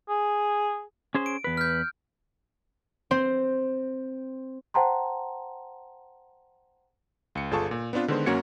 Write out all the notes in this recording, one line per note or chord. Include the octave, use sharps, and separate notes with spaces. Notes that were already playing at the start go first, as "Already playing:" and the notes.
G#4
C#4 G#4 C5
D7
E2 B4
F6 G6
C4 C5
C5 F#5 G5 A5 A#5 C6
C#2 C#7
G1 F4 G#4 A4 A5 C#6
A#2
B3 C4 D4 F4 B4
D3 D#3 G#3 B3 C5
F#2 A#3 C#4 F#4 G#6 C#7